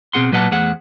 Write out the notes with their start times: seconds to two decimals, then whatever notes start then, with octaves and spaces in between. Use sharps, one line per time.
0.13 B2 C4 G#4 F#5 C6
0.32 A#2 F#3 B4 D#5 F#5 A5
0.51 E2 A3 G#4 C5 F#5